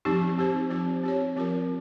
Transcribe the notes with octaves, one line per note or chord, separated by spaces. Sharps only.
F3 C4 D#4 G4
C4 G4 C5
F3 C4 F4 C5
C4 G4 C#5
F3 C4 F4 A#4